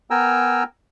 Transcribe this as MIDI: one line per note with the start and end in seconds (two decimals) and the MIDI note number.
0.10 0.63 59
0.10 0.63 70
0.10 0.63 79
0.10 0.63 80
0.10 0.63 82
0.10 0.63 88